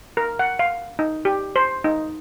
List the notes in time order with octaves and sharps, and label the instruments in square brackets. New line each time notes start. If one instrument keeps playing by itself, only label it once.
[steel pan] A#4
F#5
F5
D#4
G4
C5
D#4